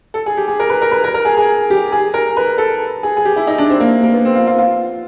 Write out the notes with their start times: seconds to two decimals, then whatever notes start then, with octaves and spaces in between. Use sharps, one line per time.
0.14 A4
0.26 G#4
0.37 G4
0.48 G#4
0.60 A#4
0.70 B4
0.82 A#4
0.92 B4
1.04 A#4
1.14 A#4
1.25 G#4
1.37 G#4
1.70 G4
1.92 G#4
2.14 A#4
2.37 B4
2.58 A4
3.03 G#4
3.17 G#4
3.25 G4
3.36 E4
3.47 D#4
3.58 D4
3.70 C4
3.80 A#3
4.03 A#3
4.14 B3
4.25 C4
4.35 F4
4.47 F4
4.59 F4